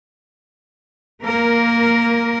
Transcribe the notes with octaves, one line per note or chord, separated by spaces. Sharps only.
A#3 A#4